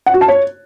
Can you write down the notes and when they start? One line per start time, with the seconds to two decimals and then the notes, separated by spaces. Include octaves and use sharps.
0.06 F#5
0.14 F#4
0.21 A5
0.28 C#5